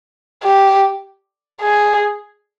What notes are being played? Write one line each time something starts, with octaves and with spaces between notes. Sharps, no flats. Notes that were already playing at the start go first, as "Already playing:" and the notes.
G4
G#4